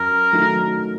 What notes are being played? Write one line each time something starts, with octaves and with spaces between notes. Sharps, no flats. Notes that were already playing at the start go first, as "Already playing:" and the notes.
Already playing: F#2 A#4
D#3 F#3 A3